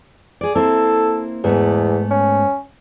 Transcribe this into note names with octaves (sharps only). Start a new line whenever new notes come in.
G#4 D5
A#3 C4 E4 A4
E2 G#2 A3 B3
C#4